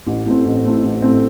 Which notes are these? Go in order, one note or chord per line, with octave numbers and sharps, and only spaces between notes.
A1
A2 A3 C4
A1
A2 A3 C4
A1
A2 A3 C4